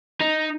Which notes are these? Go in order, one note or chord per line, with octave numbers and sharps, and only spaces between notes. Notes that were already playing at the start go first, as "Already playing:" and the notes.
D#4